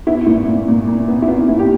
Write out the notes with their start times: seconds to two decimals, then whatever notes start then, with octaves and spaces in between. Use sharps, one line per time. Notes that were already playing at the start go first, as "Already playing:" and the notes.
0.07 B3 E4
0.26 A#2 E4
0.48 A#2
0.68 A#2
0.87 A#2
1.08 B3
1.22 E4
1.28 B3 F4
1.48 A#2 E4
1.59 G4